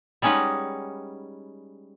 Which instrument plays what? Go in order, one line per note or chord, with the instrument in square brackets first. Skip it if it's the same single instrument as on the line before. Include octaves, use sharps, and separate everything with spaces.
[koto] G3 G#3 C#4 D#4 B4 F#5